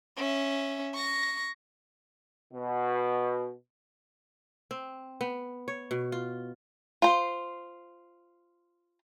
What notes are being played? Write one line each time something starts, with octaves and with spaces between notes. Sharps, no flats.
C#4 E5
C#6 A#6
B2
C4
B3
C#5
B2
F4
F4 C5